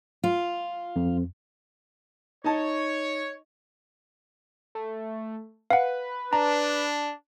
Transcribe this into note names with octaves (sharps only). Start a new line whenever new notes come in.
F4
F2
D#4 C#5 D#5 A5
A3
B4 F5 F#5
D4 A#5